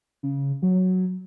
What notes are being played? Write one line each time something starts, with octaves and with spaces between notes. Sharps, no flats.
C#3
F#3